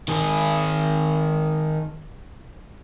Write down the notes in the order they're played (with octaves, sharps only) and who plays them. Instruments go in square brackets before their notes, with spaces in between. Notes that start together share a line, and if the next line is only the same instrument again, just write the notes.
[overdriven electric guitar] D#3 G#4